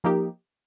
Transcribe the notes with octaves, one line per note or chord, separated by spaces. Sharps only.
F3 A#3 D#4 G4